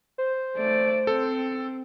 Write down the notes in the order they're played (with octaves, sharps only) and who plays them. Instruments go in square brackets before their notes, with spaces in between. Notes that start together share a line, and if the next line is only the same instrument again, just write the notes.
[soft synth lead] C5
[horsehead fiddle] A3 D5
[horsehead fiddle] C4 [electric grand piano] A4